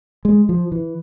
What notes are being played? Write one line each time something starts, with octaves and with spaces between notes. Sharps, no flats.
G#3
F3
E3